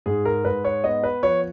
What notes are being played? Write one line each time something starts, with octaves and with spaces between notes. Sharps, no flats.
G#2 G#4
A#4
G#2 B4
C#5
B3 D#5
B4
F3 C#5